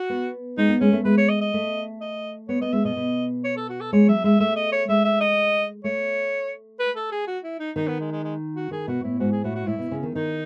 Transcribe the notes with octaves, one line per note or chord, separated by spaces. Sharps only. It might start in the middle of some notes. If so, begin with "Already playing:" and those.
Already playing: F#4
B3
G#3 D#4
B3
G#3 C#4
A3
G#3 B4
C#5
D#5
D#5
A3
D#5
B3 C#5
B3 D#5
G#3 E5
B2 D#5
B2
C#5
A4
F#4
A4
G#3 C#5
F#3 E5
G#3 E5
A3 E5
D#5
C#5
G#3 E5
E5
D#5
A3 C#5
B4
A4
G#4
F#4
E4
D#4
D#3 D#4
B3
G#3
G#3
G#3
F#4
D#3 G#4
B2 F#4
A2 E4
G#2 F#4
G#4
A2 F#4
F#4
A2 E4
B2
C#3
D#3
D#3 D#4